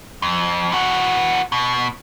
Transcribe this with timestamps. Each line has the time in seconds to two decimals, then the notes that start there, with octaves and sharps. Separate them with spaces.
0.22 F2
0.72 E3 F#4
1.52 B2